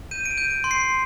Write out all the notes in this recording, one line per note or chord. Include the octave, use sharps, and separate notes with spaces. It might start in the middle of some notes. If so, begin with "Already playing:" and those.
G6 D#7
D7
D#7
G6
D7
C6
C7